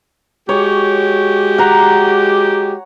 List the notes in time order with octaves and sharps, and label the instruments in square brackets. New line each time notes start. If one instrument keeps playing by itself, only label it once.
[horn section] G#3 F#4 G4 [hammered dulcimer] C#5
[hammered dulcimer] F#5 A#5